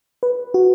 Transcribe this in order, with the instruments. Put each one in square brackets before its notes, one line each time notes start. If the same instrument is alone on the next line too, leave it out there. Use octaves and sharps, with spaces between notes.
[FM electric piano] B4
F#4